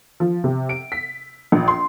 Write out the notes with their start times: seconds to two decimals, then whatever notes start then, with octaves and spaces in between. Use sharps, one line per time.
0.20 F3
0.44 C3
0.69 D7
0.92 B6
1.52 A#1
1.68 C6